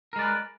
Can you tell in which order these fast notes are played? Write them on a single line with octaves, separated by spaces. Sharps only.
A#4 G#3 D5 B4